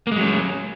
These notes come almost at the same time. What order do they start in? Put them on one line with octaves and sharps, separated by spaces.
A#3 G#3 F#3 C#4